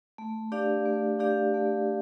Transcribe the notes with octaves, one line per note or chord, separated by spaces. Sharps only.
A3
D4 G4 D5 F5
A3
D4 G4 D5 F5
A3